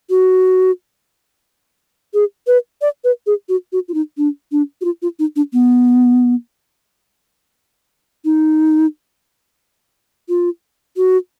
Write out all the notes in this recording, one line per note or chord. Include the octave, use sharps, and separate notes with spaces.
F#4
G#4
B4
D5
B4
G#4
F#4
F#4
F4
D#4
D4
D4
F#4
F4
F4
D#4
D4
B3
D#4
F4
F#4